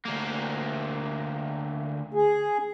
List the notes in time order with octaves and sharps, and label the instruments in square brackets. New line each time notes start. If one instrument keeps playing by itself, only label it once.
[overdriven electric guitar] D2 A#3
[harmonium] G#4